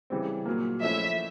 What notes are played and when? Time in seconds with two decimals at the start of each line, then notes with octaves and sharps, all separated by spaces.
0.10 C#3 E3 G3 C4
0.46 A#2 F#3 A#3
0.82 F3 A3 C#4 E4 E5